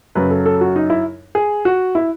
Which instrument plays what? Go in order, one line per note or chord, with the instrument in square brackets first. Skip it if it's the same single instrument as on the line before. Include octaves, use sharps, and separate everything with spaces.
[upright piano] F#2 C#3 F#3 B4
A4
A4
F#4
D#4
E4
G#4
F#4
E4